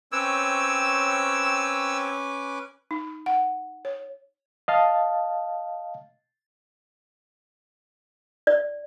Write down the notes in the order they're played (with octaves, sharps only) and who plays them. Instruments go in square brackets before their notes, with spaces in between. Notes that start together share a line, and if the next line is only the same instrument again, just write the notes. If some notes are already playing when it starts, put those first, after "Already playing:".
[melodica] C4 C#5 G5 [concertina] C#4 B4 D6 [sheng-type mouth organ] E6
[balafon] D#4
F#5
C#5
[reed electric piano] D#5 F5 A5
[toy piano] D5